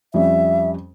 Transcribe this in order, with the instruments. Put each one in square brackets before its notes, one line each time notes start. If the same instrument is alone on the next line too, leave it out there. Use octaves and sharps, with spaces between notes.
[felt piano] F2 G3 C#4 [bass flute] E5